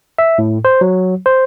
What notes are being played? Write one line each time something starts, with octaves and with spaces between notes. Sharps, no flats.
E5
A2
C5
F#3
C5